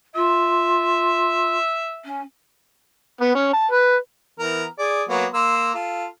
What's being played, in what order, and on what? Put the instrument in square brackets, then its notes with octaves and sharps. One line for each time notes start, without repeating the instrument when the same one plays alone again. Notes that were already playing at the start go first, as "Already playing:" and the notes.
[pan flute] F4 [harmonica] E5
[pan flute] C#4
[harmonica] B3
C#4
A5
B4
E3 B3 A#4
G#4 D5
F#3 A#3 B3
A#3 C6 E6
F4 A4